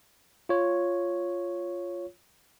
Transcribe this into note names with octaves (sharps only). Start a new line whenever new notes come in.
F4 C#5